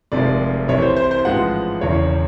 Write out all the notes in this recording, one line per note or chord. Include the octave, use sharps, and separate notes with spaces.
F1 F2 C3 D#3 G#3 D5
C2 C3 E3 C#5
C5
C5
C5
A1 G#2 F3 G#3 B3 F#5
E1 E2 C#3 C#5